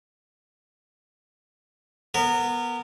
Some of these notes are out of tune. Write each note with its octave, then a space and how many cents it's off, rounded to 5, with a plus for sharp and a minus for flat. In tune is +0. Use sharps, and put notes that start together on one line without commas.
B3 -15 A#4 -25